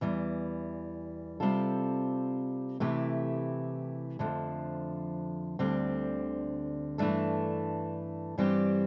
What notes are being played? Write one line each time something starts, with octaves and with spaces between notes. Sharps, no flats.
E2 E3 G3
C3 G3 C4 F4 A4
C3 E3 A3 E4 G4
F2 D3 F3 A3
D2 D3 G3 C4
G2 E3 A3 D4 A4
G2 E3 G3 C4 G4